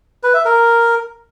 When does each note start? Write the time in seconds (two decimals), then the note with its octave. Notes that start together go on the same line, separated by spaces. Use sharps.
0.23 B4
0.34 E5
0.45 A#4